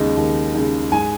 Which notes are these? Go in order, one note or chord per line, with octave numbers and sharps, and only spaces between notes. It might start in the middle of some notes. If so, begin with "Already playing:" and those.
Already playing: D#2 C#3 G#3 D#4
D#2
C#3 G#3 D#4
G#2 G#5